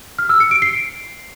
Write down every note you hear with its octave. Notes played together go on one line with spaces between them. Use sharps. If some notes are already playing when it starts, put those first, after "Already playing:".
F6
E6
C#7
D7
C7